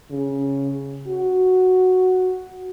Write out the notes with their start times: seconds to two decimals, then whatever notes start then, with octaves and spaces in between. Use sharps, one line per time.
0.11 C#3
1.08 F#4